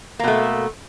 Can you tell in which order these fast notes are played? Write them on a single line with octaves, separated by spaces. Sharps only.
A#3 B2 A3